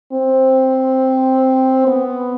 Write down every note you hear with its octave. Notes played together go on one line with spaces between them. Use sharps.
C4
B3